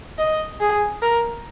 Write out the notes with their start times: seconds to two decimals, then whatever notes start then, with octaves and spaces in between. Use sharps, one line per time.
0.18 D#5
0.61 G#4
1.02 A#4